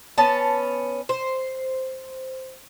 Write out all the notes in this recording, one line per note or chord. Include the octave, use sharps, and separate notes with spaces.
B3 C#4 A5
C5